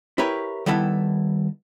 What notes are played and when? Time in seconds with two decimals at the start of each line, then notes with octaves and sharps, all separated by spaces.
0.18 E4 G4 A#4 B4 C#5
0.66 D#3 G3 B3 E4 A4